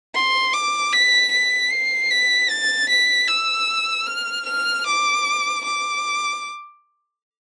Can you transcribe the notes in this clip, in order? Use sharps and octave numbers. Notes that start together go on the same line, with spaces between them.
C6
D6
B6
B6
C7
B6
A6
B6
E6
F6
F6
D6
D6